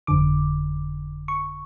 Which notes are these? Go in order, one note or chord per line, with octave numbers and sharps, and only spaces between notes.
G1 F2 D3 D6
C#6